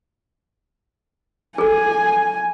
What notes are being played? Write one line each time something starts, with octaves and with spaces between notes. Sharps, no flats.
G#4 A4 G#5